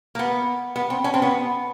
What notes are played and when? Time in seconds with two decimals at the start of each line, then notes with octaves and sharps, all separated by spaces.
0.15 A#3
0.19 B3
0.76 B3
0.90 C4
1.04 C#4
1.14 C4
1.22 B3